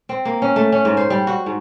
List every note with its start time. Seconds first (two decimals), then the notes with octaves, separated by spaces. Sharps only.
0.09 C4
0.25 A#3
0.42 C#4
0.56 A3
0.72 C#4
0.85 G#2
0.97 C5
1.10 G3
1.27 F#4
1.46 G#2